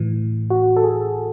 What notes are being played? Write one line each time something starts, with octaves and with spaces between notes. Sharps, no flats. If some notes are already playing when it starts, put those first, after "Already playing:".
Already playing: A2 E3
F#4
A4
G#4